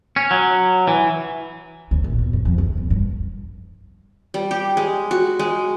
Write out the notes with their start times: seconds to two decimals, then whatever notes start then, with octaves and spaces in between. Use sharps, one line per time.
0.16 C#4
0.31 F#3
0.88 E3
1.91 D2
2.04 A#2
2.18 B2
2.33 F#2
2.45 F2
2.58 D2
2.77 B2
2.90 G2
4.34 G3
4.51 G4
4.77 G#3
5.11 F#4
5.39 G#3